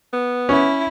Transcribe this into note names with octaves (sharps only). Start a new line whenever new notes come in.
B3
C#4 E4